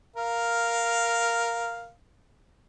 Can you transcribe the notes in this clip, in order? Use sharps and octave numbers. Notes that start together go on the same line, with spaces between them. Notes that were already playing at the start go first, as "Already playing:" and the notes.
A#4 F5